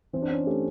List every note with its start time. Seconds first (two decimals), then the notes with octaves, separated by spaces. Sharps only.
0.13 E3 C4
0.22 D4
0.30 C#4
0.46 A3 G4